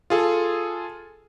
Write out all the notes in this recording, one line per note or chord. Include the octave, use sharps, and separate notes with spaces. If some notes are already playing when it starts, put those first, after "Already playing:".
F4 G#4 A4